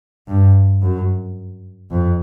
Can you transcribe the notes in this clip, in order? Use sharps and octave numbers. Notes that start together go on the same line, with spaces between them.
G2
F#2
F2